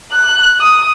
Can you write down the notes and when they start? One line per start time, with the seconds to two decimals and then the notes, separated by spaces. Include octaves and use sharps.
0.12 F#6
0.60 D#6